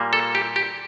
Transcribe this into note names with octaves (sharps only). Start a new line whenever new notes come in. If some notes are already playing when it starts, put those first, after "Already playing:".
Already playing: A#2 G3 A#3
A4
G4
G4